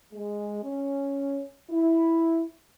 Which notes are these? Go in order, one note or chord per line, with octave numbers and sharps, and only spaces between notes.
G#3
C#4
E4